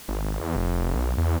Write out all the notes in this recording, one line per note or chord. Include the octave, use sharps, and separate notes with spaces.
G#1
E2
F1
B1
E2